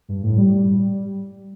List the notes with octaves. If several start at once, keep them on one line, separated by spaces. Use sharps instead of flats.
G2
A2
G3